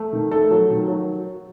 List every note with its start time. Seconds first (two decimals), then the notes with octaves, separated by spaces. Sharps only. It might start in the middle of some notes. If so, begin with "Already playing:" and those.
Already playing: A3
0.13 D#3
0.31 A3 A4
0.51 F#3
0.70 D#3
0.88 F#3